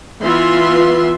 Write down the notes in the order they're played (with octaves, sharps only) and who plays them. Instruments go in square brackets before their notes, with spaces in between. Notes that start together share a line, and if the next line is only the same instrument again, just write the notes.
[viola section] E3 B3 F4 E5 C6